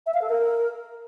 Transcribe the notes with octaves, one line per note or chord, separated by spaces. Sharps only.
E5
F5
A4
A#4